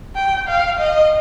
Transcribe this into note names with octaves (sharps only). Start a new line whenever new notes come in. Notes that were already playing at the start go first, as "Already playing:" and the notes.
G5
F5
D#5